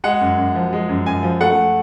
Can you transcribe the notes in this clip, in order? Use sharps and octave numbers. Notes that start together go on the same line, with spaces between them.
G#3 F#5
F#2
F#2
F3
G#3
F#2
F#2 G#5
F3
A3 F#5